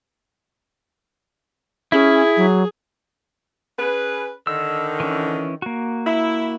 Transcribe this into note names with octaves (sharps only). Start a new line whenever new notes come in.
C#4 E4 G#4
F#3
C#4 G#4 B4
D3 D#3 E6
E3 C#4
A#3 F#4
E4